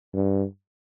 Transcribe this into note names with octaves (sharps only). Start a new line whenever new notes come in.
G2